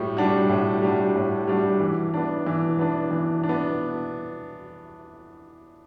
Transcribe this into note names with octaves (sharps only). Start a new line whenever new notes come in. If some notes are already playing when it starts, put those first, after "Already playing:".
Already playing: A2 G3 F#4
G3 D4 F#4
A2
G3 D4 F#4
A2
G3 D4 F#4
E3
B3 D4
E3
B3 D4
E3
D4
B3